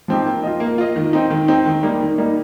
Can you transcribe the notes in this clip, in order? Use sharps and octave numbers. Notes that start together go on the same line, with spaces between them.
F3 C4 D#4 G4
A#3
F4 D#5
A#3
F4 D#5
D#3
C4 D#4
D#3
C4 D#4
D#3
G3 A#3 D#4
D#3
G3 A#3 D#4